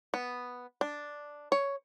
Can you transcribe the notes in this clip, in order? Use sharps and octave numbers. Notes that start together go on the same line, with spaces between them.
B3
D4
C#5